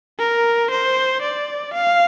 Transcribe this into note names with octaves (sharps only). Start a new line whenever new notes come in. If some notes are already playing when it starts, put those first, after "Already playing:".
A#4
C5
D5
F5